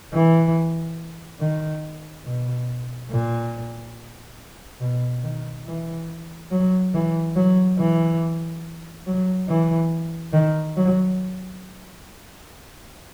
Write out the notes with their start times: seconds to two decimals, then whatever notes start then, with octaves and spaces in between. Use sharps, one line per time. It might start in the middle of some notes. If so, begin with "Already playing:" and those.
0.13 E3
1.40 D#3
2.25 B2
3.11 A#2
4.80 B2
5.24 D#3
5.66 E3
6.51 F#3
6.94 E3
7.36 F#3
7.78 E3
9.07 F#3
9.48 E3
10.33 D#3
10.76 F#3